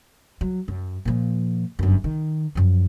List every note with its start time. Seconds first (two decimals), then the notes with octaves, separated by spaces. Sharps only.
0.41 F#3
0.68 F#2
1.05 A#2 F3
1.79 G1 F#2
2.04 D#3
2.55 F#2 F3